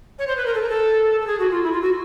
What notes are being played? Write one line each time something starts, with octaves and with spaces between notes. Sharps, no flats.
C#5
C5
B4
A#4
A4
A#4
A4
A4
G#4
F#4
F4
E4
F4
F#4